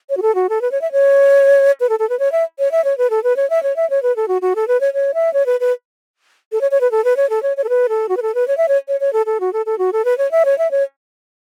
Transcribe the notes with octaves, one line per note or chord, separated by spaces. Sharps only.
C#5
F#4
A4
F#4
A4
B4
C#5
E5
C#5
B4
A4
A4
B4
C#5
E5
C#5
E5
C#5
B4
A4
B4
C#5
E5
C#5
E5
C#5
B4
A4
F#4
F#4
A4
B4
C#5
C#5
E5
C#5
B4
B4
A4
C#5
C#5
B4
A4
B4
C#5
A4
C#5
C#5
A4
B4
A4
F#4
B4
A4
B4
C#5
E5
C#5
C#5
C#5
A4
A4
F#4
A4
A4
F#4
A4
B4
C#5
E5
C#5
E5
C#5